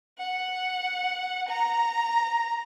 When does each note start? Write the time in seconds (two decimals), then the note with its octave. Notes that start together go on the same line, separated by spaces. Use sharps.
0.19 F#5
1.48 A#5